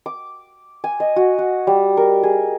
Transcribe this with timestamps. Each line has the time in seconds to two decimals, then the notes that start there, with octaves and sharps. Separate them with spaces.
0.06 D6
0.84 G#5
1.00 D#5
1.16 F#4
1.38 F#4
1.67 G3
1.97 A#4
2.23 G#4